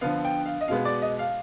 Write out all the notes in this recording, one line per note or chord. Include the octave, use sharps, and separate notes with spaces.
D3 F3 B3 F5
G5
F5
D#5
B2 G#3 B3 F5
D5
D#5
F5